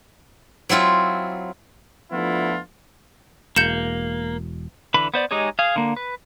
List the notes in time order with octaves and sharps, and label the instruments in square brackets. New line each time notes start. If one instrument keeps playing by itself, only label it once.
[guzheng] F#3 C4 E4 F4
[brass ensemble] F3 A3 B3 D4 E4 F4
[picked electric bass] E1 [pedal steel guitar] A#3 [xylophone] G6 C#7 E7
[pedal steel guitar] D3 E3 B4 B5
B3 C5 D5
G#3 D#4 G4 G#4 C#5
G#4 F5
D3 A#3
B4